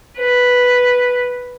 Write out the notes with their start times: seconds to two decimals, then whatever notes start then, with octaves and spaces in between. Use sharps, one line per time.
0.17 B4